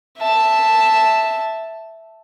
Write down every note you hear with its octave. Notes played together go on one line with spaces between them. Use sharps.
E5 A5